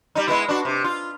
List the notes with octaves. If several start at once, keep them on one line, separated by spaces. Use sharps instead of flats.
G3 D#4
G#3 B3 E4
D4 F#4
C3
F4